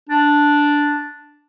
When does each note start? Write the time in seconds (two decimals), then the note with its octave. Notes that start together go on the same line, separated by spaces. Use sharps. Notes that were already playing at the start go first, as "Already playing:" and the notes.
0.09 D4